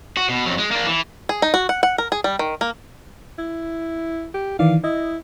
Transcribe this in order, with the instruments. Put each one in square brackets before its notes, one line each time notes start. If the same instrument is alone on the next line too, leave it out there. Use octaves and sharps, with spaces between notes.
[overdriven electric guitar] F#4
B2
F2 F#3
G#3
A#3 D4
E3
[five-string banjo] G#4
D#4
F#4
F#5
F#5
A#4
G#4
G3
D#3
A#3
[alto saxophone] E4
G4
[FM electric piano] D#3 E3 D5 [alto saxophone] F5
[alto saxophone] E4 [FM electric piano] D#5